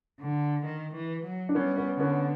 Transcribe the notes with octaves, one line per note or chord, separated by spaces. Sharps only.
D3
D#3
E3
F#3
D4
G3 B3 C#4
B3 C#4
D3 B3 C#4